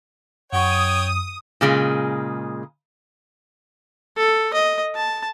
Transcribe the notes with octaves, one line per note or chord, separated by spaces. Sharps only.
F#2 C#5 F#5 G5 C#6 D#6
A#2 C#3 G#3
A4
D#5
A5